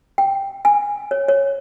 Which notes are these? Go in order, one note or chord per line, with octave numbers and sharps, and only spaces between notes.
G5
G#5
C#5
C#5